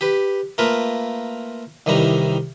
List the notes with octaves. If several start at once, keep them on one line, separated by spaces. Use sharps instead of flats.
G4 B4
A3 A#3 F4 A#4 B4
C2 D#3 E3 G3 A#5